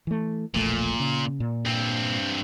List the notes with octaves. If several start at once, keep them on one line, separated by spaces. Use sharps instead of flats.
E3 A3
E1 A#1 A#2 A3
C#3
A#2
G2 C4